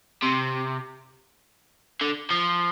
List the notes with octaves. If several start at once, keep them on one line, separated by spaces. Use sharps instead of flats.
C3
D3
F3